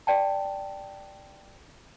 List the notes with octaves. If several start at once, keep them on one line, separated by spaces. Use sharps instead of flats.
D5 G5 A5